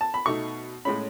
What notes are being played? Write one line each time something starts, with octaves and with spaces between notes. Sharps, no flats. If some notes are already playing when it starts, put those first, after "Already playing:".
A5
B5
B2 A3 D#4 C#6
A2 G#3 C#4 B5